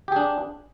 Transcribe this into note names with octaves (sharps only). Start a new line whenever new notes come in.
D4 G4 G#4